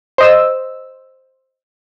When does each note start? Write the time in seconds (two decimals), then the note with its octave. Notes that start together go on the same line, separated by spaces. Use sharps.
0.18 C5 D#5 E6